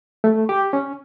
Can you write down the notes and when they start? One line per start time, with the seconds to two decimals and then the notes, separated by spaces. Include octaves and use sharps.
0.24 A3
0.49 G4
0.73 C#4